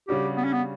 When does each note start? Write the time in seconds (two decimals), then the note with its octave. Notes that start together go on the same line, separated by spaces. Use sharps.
0.08 C#3 G3 D4 F#4 G4
0.37 B3
0.45 C#4
0.53 B3